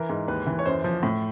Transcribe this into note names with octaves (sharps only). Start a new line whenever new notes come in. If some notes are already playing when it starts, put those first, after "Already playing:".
Already playing: E3 A#4
G#2
D#2 B4
E3
C#5
F#2 C5
F3
A2